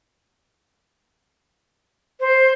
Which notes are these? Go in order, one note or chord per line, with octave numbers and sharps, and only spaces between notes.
C5